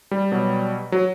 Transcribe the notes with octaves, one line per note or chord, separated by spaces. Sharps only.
G3
B2 F#3
F#3